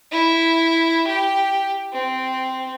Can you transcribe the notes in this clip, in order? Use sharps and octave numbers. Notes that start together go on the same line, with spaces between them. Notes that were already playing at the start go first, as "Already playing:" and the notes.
E4
G4
C4